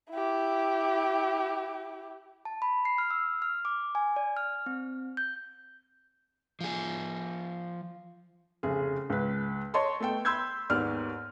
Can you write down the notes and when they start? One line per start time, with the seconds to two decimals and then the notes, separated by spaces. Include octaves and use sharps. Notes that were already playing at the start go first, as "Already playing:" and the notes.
0.11 E4 G4
2.45 A5
2.62 B5
2.85 C7
2.98 F6
3.10 E6
3.42 F6
3.65 D6
3.95 G#5
4.16 D5
4.37 F6
4.66 C4
5.17 G6
6.61 F3 G#4
8.63 F1 C#3 G#4
9.10 C#2 B4
9.74 C#5 D#5 A5 C6 C#6
10.00 A3 B3 A4 G5
10.25 B5 C6 E6 G6 G#6
10.70 D#2 G#2 B3 D5 F6